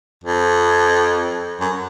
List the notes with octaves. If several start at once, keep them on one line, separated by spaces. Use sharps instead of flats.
F2
F#2